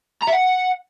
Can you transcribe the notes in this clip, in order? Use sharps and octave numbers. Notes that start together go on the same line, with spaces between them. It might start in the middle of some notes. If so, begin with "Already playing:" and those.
A#5
E5
F#5